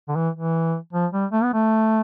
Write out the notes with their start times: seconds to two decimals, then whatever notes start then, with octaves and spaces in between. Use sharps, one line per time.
0.09 D3
0.16 E3
0.36 E3
0.93 F3
1.13 G3
1.32 A3
1.43 B3
1.54 A3